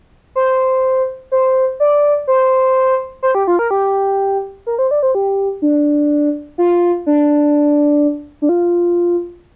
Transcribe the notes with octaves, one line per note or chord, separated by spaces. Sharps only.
C5
C5
D5
C5
C5
G4
F4
A#4
G4
A#4
C5
D5
C5
G4
D4
F4
D4
D4
F4